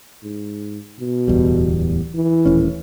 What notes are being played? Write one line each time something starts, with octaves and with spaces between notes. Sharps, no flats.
G#2
B2
D1 E2 G3
E3
D#1 A2 C#4